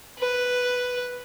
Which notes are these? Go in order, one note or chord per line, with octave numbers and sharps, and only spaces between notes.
B4